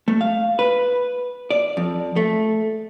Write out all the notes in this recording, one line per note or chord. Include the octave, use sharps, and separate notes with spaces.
A3
F5
B4
D5
F2
A3